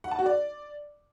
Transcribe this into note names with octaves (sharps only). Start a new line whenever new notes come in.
F#5
A5
F#4
D5